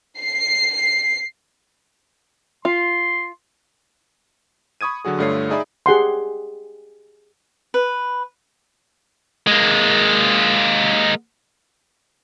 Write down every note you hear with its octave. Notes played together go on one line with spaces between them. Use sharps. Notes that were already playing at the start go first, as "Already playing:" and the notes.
C7
F4 C6
B5 C#6 D#6 G#6 D#7
D3 F#3 F#4 G#4
G2 D3 A3 F4 C#5 C7
D#4 G#4 D5 E5 B5
G4 G#4 F#5 C6
B4
G#3 A#3